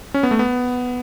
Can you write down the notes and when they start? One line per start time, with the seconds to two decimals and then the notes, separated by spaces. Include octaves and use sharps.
0.14 C#4
0.23 B3
0.31 A3
0.39 B3